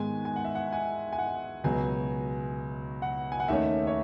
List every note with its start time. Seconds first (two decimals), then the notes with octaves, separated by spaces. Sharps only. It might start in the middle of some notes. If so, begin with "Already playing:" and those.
Already playing: G#2 D#3 G#3 B3 G#5
0.25 G#5
0.36 F#5
0.45 E5
0.55 F#5
0.73 G#5
1.13 G#5
1.19 F#5
1.64 C#2 B2 F#3 G#5
3.02 F#5
3.32 G#5
3.40 F#5
3.48 D#2 D#3 A3 C#4 E5
3.87 C#5